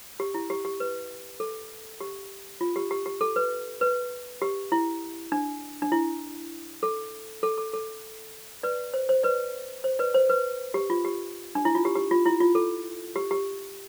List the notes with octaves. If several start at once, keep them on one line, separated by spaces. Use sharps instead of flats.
G4
E4
G4
G4
B4
A4
G4
F4
G4
G4
G4
A4
B4
B4
G4
E4
D4
D4
E4
A4
A4
A4
A4
B4 D5
C5
C5
B4 D5
C5
B4 D5
C5
B4
G4
F4
G4
D4
E4
F4
G4
G4
F4
E4
F4
A4
G4
G4